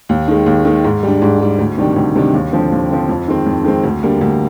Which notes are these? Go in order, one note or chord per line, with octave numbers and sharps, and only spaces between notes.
D#2
D#3 G#3
D#2
D#3 G#3
G#2
G3 D4
G#2
G3 D4
D2
C3 D#3 G3 D4
D2
C3 D#3 G3 D4
D#2
D3 F3 C4
D#2
D3 F3 C4
F2
D#3 G#3 C4
F2
D#3 G#3 C4
D2
D3 G3 A#3
D2